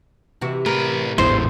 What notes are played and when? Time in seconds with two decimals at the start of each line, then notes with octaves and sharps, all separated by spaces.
0.41 C3 E3 F#4
0.66 A2 A#4 B4
1.18 A1 E2 G#2 D3 E3 C5